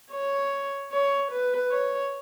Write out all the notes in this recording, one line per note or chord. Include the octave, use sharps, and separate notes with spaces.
C#5
C#5
B4
C#5